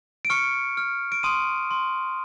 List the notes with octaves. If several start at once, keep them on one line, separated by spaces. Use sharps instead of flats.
D7
C#6 F6 C#7
F6
D7
C6 D#6 D#7
C6